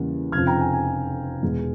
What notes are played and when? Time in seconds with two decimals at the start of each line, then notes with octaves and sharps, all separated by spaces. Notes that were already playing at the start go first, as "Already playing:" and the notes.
Already playing: E2 C#3 G3 A#3
0.32 F1 F2 C#3 F3 F6 G#6
0.47 G5 A#5
0.61 G#5
0.73 G#5
1.42 E1 E2 E3 G#3